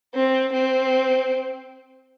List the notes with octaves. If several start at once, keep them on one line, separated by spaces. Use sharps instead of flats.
C4
C4